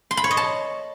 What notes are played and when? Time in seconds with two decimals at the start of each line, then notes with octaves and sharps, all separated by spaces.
0.11 C6
0.17 B5
0.24 C#5
0.31 D#5
0.37 A5